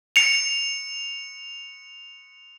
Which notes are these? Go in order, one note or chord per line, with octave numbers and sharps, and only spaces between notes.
C#7 F7